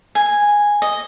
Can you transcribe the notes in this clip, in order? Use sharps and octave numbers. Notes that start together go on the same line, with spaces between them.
G#5
D#5